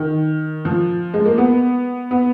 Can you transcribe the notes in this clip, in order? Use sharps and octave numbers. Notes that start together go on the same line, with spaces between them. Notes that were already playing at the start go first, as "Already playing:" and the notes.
Already playing: D#3
F3
G#3
A#3
B3
B3